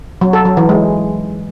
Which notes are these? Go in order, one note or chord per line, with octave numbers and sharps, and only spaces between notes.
F#3
A4
F#3
E3
G#3